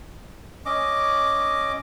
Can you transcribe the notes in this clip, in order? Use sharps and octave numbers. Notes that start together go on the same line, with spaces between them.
C#4 D#5 D6